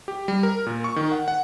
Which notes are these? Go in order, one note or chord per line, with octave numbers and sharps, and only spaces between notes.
G4
G3
A#4
A#2
C#6
D#3
F#5
F#5